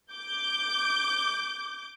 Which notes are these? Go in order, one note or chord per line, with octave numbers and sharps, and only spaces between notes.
D6 G6